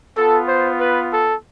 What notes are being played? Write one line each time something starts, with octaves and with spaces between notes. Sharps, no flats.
B3 F4 A4
C5
B4
A4